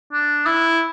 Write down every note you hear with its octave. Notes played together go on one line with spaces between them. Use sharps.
D4
E4